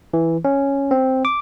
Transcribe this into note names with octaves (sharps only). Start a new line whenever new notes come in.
E3
C#4
C4
D6